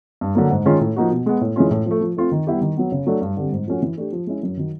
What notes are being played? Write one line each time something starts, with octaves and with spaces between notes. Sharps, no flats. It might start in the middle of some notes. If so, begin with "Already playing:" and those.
G2
D3 F#3 A#3
G#2
D#3 G#3 C#4 F4
A2
F3 A#3 D#4 F#4
B2
G#3 B3
A2
E3 G#3 C#4 F4
A2
F3 A3
F3
A3 C4 F4
D#3
G3 B3 E4 G4
D#3
F#3 B3
C#3
F#3 A3 D4
G2
D3 G3 C4
G#2
F3 A3 C#4 F#4
E3
A3 D4 G4
F3
G#3 C#4 E4
F#2
D#3 F#3